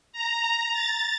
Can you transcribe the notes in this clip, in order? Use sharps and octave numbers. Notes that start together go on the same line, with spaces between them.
A#5
A6